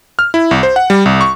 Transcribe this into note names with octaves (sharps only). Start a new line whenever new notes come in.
F6
E4
C2
C5
F#5
G3
C2
C#6